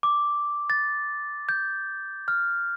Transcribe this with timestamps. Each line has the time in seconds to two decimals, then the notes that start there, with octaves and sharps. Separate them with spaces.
0.03 D6
0.70 A6
1.49 G6
2.28 F6